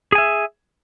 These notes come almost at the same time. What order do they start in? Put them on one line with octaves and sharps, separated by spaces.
G#4 G#5 E5